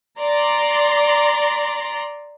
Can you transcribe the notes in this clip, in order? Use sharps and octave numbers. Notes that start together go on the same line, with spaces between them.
D5 A#5 C6